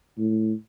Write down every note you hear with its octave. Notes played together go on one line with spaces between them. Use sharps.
A2